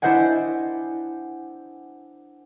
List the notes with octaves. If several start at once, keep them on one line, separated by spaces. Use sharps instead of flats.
D4 E4 C5 D#5 F#5 G#5